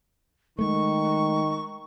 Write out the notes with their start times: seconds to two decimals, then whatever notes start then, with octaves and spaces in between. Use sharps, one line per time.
0.59 D#3 G#3 A3 C#6